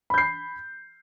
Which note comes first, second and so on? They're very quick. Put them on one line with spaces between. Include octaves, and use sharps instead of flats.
B5 G6 C7